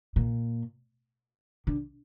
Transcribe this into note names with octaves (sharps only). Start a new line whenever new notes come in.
A#2
D3